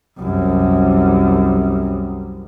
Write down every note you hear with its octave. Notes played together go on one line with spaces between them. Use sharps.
C2 F#2